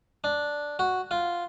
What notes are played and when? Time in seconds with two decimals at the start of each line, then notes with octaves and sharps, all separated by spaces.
0.24 D4
0.79 F#4
1.11 F4